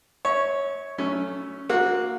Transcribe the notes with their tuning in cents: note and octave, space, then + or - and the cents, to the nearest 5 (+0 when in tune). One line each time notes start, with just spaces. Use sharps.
C#5 +0 E5 -40
F#3 +0 A3 +0 C#4 +5
A#3 +0 F#4 -20